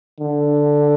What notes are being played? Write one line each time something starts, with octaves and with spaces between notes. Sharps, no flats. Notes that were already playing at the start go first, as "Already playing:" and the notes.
D3